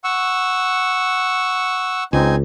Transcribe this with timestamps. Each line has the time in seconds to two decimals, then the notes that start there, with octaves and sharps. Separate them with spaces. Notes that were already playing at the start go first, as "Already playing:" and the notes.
0.04 F#5 C#6 E6
2.13 C#2 C4 D#4 G#5